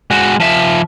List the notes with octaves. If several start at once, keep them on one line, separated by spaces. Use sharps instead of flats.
G#3 F#4
F3 E5